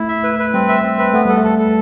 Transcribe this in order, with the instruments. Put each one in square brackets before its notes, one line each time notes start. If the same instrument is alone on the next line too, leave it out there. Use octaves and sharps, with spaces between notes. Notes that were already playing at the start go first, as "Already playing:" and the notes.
Already playing: [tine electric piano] A3 [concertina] E4
[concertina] E5
B4
B4
[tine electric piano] G3 [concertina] C4
[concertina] E5
C4
B4
[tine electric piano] A3 [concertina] B3
[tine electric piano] G3 [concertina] A4
[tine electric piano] A3
[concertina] A4
A4